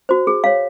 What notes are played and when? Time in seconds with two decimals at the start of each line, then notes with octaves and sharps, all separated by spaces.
0.09 F#4 C5
0.27 G#4
0.44 C#5 F5